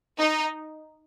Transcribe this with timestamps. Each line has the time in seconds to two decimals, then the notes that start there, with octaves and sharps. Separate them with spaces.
0.19 D#4